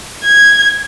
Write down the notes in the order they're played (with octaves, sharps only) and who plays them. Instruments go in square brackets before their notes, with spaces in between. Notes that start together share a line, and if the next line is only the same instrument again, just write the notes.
[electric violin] G#6